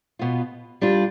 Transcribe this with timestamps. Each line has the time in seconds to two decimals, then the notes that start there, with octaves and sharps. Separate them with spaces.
0.19 B2 B3 F4
0.81 G3 D4 F4